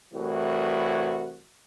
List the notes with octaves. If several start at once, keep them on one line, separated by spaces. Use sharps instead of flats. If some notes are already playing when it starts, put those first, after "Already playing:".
C2 A2 E3 F#4